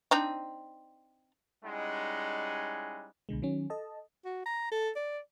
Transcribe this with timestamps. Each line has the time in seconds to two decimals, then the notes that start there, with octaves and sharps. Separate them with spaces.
0.11 C4 D4 D#4
1.64 G3 G#3 C#4 D#4 E4 F#5
3.29 C2 B2 D3 G#3
3.42 D#3 F#3 C#4
3.70 A4 D#5 A5
4.25 F#4
4.46 A#5
4.72 A4
4.96 D5